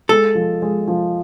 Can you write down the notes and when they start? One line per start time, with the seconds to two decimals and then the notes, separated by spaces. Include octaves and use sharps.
0.09 G#3 A4
0.35 F3
0.62 G#3
0.88 F3